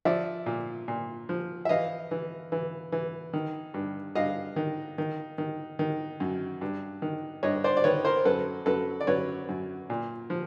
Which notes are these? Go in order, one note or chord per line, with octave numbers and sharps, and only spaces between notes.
F3 D5 E5
A#2
A#2
F3
E5
E3 D#5 F5
E3
E3
E3
D#3
G2
G2 D#5 F5
D#3
D#3
D#3
D#3
F#2
G2
D#3
G2 C#5 D#5
C5 D5
D5
D#3 B4 C#5
A#4 C5
F#2 A4 B4
F#2 A4 B4
D5
F#2 B4 C#5
F#2
A#2
F3